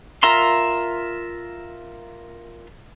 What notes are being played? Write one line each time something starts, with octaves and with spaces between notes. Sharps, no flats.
F4 A#4 E5 A#5 C6